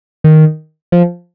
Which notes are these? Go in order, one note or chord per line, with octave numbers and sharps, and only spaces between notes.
D#3
F3